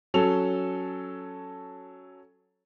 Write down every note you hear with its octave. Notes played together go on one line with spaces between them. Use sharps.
F#3 C#4 A4 F7